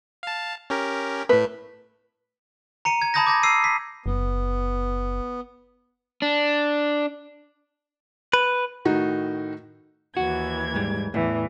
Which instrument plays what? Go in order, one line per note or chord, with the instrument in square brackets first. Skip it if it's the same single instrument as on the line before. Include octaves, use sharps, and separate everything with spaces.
[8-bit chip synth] F5 A5
C#4 G4 A#4
[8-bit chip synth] A2 A3 [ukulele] B4
[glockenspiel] A#5 C#7 D#7
G#6
A5 B5 D#6 G6 G#6 A#6
D6 G6 G#6 A#6
E6 C7 D#7
B6
[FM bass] F#1 [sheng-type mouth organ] B3
[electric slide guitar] D4
[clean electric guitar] B4
[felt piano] A2 D#3 D#4 F#4
[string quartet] D#2 E3 G#6 [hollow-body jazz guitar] F#4
[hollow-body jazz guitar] G#2 G3
[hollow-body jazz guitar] E2 A2 [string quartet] E3